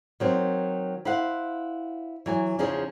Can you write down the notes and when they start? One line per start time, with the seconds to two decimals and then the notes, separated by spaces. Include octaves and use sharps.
0.20 D#3 F#3 C4
1.05 E4 C5 F5 F#5
2.26 E3 F#3 G#5
2.58 E2 C#3 F3 C#4 D#4 G#4